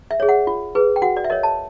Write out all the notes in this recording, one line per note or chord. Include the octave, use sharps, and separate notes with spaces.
E5
G#4 C#5
F#5
F4
G#4 B4
G5
F#4 F#5
D5
E5
A#4 C#5 D#5
A5